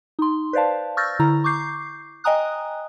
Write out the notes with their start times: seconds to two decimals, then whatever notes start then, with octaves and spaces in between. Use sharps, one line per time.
0.19 D#4 C6
0.53 B4 C5 D5 F5 A5
0.97 C#6 E6 F6 G6 A6 A#6
1.19 D3 E4 A#5
1.44 C#6 D6 G6 C7
2.24 D#5 G5 G#5 A#5 D#6 F#6